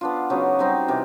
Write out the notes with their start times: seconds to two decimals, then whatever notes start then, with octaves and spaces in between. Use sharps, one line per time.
0.01 B3 D4 F4
0.30 C#3 F#3 B3 D#4
0.59 G3 C4 D#4
0.88 C3 E3 G3